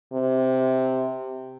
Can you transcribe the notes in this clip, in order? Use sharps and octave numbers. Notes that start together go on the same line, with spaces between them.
C3